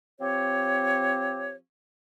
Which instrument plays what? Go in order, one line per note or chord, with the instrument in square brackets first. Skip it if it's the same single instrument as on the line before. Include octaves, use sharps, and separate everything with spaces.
[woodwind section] F3 C4 G4 C#5